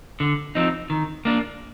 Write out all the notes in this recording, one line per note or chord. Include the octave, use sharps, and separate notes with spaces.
D3
F3 C4 D#4
D#3
A#3 D4